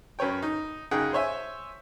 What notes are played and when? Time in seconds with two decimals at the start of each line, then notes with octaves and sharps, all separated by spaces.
0.19 F#2 B4 C#5 G5
0.42 D#4
0.91 F#2 C#3 D#4 G#4 F#5 G5
1.13 C5 C#5 E5 G#5